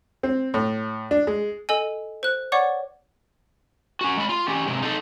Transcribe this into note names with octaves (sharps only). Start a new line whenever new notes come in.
C4
A2
D4
G#3
A4 D#5 G#5
C5 F#6
C#5 D5 F#5 C#6 D6
C#4 F#4
G#3 B5
F4
C#4 G4
C3 G#3
D#4 A4